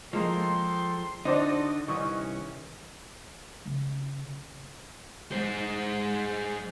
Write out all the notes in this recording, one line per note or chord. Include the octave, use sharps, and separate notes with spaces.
F3 G#3 A#3 A4 G5 C6
D3 D4 D#4 F#4 A4 C5 D5 D#5
C2 D#3 E3 C#4 D#5 C#6
C#3
G#3 C5